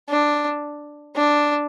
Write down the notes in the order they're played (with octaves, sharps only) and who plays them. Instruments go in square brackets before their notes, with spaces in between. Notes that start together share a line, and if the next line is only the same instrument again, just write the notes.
[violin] D4
D4